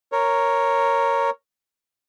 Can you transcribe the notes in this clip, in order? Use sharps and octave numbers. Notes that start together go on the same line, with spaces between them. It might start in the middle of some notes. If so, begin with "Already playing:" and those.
A#4 C#5